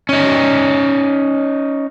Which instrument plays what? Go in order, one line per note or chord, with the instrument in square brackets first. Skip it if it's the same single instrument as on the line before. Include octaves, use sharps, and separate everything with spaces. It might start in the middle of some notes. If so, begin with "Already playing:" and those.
[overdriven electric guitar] C#4 D#4